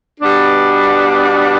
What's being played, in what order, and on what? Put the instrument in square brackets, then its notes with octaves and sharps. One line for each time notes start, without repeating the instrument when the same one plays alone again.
[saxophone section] B2 G3 B3 D4